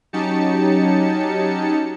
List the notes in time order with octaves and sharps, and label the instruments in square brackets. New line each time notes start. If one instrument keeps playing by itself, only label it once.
[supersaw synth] F#3 C#4 D#4 G4 A5 C#7